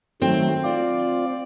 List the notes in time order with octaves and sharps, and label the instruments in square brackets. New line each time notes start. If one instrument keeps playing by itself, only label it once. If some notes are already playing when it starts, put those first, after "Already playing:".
[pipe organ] D#3 F#3 A3 [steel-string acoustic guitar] C4
[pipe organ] F4 D5